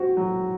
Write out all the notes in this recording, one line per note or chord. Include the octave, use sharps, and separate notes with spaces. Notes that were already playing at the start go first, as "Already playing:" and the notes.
Already playing: C4 F#4
F#3